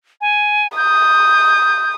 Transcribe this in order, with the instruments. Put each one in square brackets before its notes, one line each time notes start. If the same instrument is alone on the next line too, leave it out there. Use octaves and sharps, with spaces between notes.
[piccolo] G#5
[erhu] D#6 [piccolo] G6